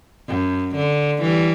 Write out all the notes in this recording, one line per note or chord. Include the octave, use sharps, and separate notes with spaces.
F#2
D3
E3 G3